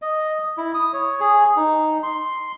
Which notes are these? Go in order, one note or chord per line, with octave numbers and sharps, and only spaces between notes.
D#5
E4
D#6
C#5
G#4
D#4
C6